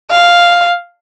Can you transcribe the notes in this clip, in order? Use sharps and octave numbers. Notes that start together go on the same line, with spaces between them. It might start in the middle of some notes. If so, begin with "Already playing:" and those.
F5